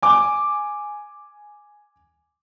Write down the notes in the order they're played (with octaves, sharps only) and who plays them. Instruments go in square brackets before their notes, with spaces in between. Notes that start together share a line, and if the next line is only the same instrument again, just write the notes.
[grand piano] G#5 D6